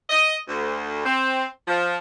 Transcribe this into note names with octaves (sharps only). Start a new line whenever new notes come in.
D#5
D2
C4
F3